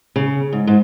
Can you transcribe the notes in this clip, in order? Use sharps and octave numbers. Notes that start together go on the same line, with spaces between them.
C#3
G#2
G#2